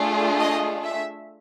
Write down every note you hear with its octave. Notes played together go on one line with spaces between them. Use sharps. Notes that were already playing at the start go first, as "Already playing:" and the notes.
Already playing: A3 D4 F4 G#4
D#5
E5